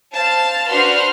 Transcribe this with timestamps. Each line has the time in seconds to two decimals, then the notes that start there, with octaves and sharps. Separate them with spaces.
0.14 C5 F5 A5
0.71 D4 F#4 B4 C5 C6 F6